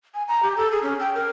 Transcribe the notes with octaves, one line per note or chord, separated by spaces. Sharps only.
G#5
A#5
G4
A4
G#4
C#4
G5
A#4